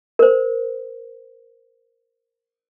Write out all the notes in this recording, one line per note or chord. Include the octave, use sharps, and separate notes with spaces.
A#4 C5